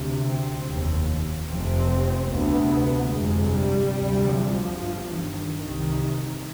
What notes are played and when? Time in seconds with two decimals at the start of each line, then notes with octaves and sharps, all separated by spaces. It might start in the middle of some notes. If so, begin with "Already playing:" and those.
Already playing: D2 C3
0.24 C4
0.66 F1 D#2
1.48 F1 F2 C3 C4
2.30 D2 C3 B3
3.12 G1 F2 C3 G#3
3.53 G3
3.95 D2 C3
4.35 F3
4.76 G1 G2
5.18 D#3
5.59 C2 C3 D#3